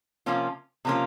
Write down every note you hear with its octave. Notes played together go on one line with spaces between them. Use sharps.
C3 F3 A#3 C#4 F4
C3 F3 A#3 C#4 F4